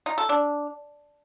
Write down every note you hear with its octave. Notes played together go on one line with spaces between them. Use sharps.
D#4
A4
D4